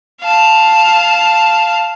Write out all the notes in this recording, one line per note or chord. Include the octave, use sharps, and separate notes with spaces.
F5 A5